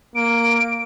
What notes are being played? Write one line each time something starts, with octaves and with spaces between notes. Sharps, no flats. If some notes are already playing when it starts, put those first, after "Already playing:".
A#3 D7